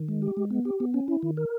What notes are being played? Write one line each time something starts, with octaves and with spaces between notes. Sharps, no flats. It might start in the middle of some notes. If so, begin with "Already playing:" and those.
Already playing: D#3
G#3
G4
G#3
B3
G4
B3
C#4
E4
D#3
A#4